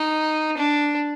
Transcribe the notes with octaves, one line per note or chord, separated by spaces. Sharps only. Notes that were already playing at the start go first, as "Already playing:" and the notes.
Already playing: D#4
D4